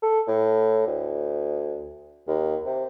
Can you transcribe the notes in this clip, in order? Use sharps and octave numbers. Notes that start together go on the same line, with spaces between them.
A4
A2
D2
D#2
C3